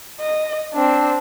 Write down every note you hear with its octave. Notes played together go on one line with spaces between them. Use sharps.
D#5
C4 D4